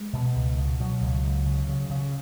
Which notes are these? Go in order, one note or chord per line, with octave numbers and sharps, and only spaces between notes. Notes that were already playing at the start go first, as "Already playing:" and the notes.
Already playing: G#3
B2
C#2
B2
B2 F#3
C#2
C#2
C#3
C#3
C#3